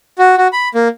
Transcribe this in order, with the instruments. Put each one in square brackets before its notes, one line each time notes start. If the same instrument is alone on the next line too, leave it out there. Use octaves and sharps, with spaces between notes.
[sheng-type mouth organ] F#4
F#4
B5
A#3